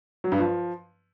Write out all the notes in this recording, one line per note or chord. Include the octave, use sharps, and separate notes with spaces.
F#3
G2
F3